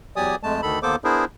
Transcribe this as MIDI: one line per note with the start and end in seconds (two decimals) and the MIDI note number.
0.16 0.35 40
0.16 0.35 54
0.16 0.35 67
0.16 0.35 74
0.16 0.35 80
0.16 0.35 87
0.43 0.61 41
0.43 0.61 56
0.43 0.61 57
0.43 0.61 81
0.62 0.79 38
0.62 0.79 51
0.62 0.79 69
0.62 0.79 83
0.83 0.96 39
0.83 0.96 58
0.83 0.96 59
0.83 0.96 69
0.83 0.96 72
0.83 0.96 86
1.04 1.25 59
1.04 1.25 62
1.04 1.25 64
1.04 1.25 68
1.04 1.25 70
1.04 1.25 72